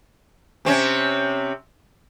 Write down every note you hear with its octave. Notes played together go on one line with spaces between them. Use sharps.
C3 C4 C#4